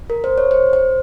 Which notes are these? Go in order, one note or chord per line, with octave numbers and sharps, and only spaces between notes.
A#4
C5
C#5
C5
C5